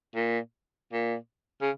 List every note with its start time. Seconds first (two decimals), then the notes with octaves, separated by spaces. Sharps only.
0.15 A#2
0.92 A#2
1.61 C#3